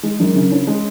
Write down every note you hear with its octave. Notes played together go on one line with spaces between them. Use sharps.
G#3
F#2
C#3
C#4
G#3